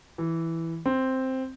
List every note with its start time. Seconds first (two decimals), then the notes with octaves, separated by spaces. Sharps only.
0.18 E3
0.86 C4